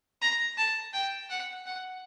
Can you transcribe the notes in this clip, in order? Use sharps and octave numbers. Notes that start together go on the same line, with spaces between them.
A#5
A5
G5
F#5
F#5